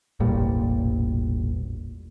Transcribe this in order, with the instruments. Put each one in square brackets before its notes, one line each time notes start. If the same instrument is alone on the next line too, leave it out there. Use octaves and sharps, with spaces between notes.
[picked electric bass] E1 A1 A#2 G3